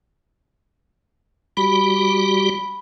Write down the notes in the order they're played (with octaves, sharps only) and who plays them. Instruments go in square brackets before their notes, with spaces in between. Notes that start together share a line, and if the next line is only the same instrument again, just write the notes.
[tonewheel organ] G3 F#4 G4 [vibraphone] B5